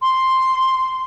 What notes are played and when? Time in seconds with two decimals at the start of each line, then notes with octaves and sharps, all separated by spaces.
0.02 C6